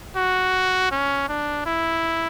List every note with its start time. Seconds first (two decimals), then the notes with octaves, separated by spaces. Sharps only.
0.16 F#4
0.91 C#4
1.28 D4
1.66 E4